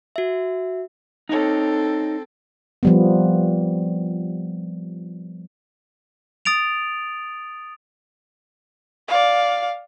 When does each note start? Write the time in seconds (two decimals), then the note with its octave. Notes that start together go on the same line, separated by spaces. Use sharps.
0.16 F#4 E5
1.29 C4 D#4 A4 C#5
2.83 F3 G3 B3
6.45 D#6 A6 D7 F7
9.08 D5 F5